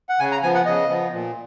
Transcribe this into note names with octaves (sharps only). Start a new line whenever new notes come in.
F#5
C#3 G#5
A#5
F3 B3 G#5
F#5
C#3 D#5
F3 B3
A#2